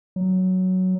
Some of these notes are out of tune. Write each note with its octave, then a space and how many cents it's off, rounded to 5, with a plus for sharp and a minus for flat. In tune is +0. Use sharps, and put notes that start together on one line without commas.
F#3 +5